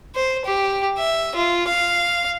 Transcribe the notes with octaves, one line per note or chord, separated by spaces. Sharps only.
C5
G4
E5
F4
F5